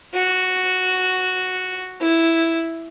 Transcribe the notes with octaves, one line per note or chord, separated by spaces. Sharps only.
F#4
E4